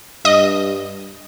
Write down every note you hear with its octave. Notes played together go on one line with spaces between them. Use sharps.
G2 D#5